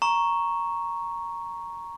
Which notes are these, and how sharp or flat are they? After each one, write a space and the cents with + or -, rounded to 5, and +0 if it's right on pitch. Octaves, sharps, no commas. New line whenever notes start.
A#5 +0 C#6 +0